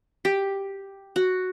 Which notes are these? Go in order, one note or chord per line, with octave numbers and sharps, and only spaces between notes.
G4
F#4